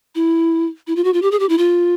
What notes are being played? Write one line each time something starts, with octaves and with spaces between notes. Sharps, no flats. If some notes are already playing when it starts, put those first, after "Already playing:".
E4
E4
F4
F#4
F4
G4
G#4
G4
E4
F4